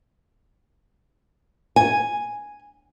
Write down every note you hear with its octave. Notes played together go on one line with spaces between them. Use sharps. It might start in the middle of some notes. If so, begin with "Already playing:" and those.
G#5